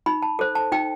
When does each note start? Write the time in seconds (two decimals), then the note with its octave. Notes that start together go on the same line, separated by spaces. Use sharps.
0.06 D#4 B5
0.22 A5
0.39 A4 C5
0.55 A5
0.72 D#4 G5